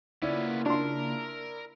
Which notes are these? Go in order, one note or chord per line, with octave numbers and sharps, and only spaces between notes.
C#3 A#3 B3 C#4 E4 F4 D5
D4 A#4 C6